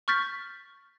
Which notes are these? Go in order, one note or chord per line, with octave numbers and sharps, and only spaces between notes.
C#6 F6 G6 A6 B6